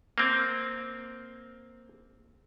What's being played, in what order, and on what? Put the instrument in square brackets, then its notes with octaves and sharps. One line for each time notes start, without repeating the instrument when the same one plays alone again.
[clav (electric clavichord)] A#3 C4